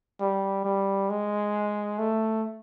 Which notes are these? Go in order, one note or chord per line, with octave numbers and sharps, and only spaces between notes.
G3
G3
G#3
A3